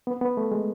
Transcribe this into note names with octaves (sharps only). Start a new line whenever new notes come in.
B3
B3
A3
G#3